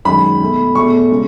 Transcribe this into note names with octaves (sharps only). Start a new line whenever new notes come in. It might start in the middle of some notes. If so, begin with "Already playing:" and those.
F#2 D#3 G#3 B5
B2 A3
E2 B2 A3 C#6
C#3 G#3